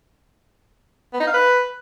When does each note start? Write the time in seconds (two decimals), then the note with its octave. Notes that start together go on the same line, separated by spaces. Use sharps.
1.13 B3
1.20 D#4
1.27 F5
1.34 B4